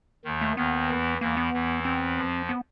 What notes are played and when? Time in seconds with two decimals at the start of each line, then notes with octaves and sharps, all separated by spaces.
0.25 D#2 D#3
0.41 A3
0.57 D#2 D#3 B3
0.89 E2 E3
1.21 E2 E3 A#3
1.37 B3
1.53 E2 E3
1.85 C4
2.17 F2 F3
2.49 B3